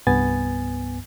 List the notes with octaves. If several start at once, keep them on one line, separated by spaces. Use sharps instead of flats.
C2 G2 B3 G#5 A6